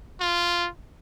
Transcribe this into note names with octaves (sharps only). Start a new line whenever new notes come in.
F4